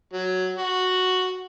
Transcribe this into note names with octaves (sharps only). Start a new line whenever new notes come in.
F#3
F#4